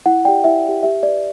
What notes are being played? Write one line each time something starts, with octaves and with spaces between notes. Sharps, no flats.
E4 F#5
G4 D5 G5
E4 E5
G4 D5
G4 E5
D5
B4